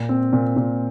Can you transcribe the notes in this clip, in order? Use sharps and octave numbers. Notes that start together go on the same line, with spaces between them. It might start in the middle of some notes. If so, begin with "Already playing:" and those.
Already playing: A#2
C4
A#2
A#2